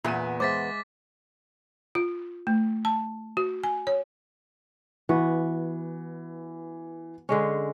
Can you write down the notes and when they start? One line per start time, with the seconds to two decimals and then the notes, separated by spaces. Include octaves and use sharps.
0.04 E2 A#2 B3 E5 G#5 D#7
0.40 G#3 C5 E5 C6 D6 A6 B6
1.95 F4
2.47 A3
2.85 A5
3.37 F#4
3.64 G#5
3.87 C#5
5.09 E3 B3 F#4
7.29 D3 G#3 C#4